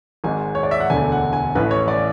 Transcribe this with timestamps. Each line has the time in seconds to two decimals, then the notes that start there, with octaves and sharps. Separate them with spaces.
0.24 G#1 G#2 G#3 G#5
0.55 C#5
0.63 D5
0.71 E5
0.80 F#5
0.90 E1 D2 D3 A3 D4 G#5
1.12 F#5
1.33 G#5
1.55 A1 A2 E3 B4
1.71 C#5
1.88 D5